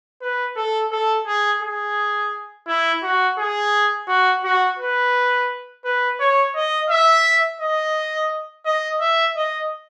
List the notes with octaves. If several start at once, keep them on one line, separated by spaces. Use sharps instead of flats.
B4
A4
A4
G#4
G#4
E4
F#4
G#4
F#4
F#4
B4
B4
C#5
D#5
E5
D#5
D#5
E5
D#5